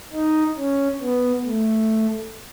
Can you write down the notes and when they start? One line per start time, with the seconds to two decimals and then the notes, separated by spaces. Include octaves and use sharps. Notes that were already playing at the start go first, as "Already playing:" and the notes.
0.13 D#4
0.57 C#4
1.02 B3
1.45 A3